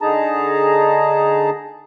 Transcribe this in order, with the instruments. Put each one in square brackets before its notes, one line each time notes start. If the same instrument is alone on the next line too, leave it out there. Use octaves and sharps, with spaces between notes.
[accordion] D3 D#4 G#4 A5 A#5